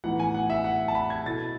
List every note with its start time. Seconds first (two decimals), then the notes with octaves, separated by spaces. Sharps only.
0.04 A2 E3 B3 D#4 F#5
0.20 G#5
0.34 F#5
0.50 E5
0.64 F#5
0.88 A5
0.95 B5
1.10 G#6
1.26 B2 A3 E4 A6